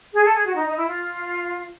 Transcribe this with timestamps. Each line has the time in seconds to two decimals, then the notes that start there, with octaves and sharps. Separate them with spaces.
0.14 G#4
0.25 A4
0.35 G#4
0.46 F#4
0.55 D#4
0.66 D#4
0.77 E4
0.87 F4